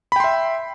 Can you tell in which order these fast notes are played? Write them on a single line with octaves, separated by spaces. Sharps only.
B5 G5 C6 E5